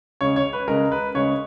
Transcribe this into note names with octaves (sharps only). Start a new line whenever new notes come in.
C#3 G#3 C#5
C#5
B4
C#3 G#3 A#4
B4
C#3 G#3 C#5